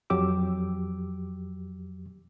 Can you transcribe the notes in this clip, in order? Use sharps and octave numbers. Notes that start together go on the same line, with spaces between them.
F2 F#3 G4 D6 E6